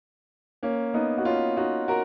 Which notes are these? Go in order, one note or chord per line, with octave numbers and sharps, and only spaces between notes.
A#3 C#4
B3 D#4
F#4
C#4 F4
D#4 F#4
F#4 A#4